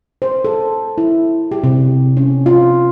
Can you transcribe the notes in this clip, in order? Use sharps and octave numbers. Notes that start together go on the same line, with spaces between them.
C5
A4
E4
G4
C3
C#4
F4